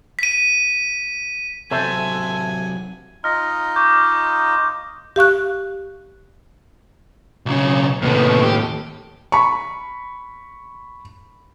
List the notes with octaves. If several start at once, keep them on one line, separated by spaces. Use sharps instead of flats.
B6 D#7
C3 F#3 A4 C5 E5 G#5
D#4 F4 D#5 F6 A#6
C#6 D6 G6
G4 F5 C#6 F#6
B1 C#3
D#2 A2 C3 B3
G4
B5 C#6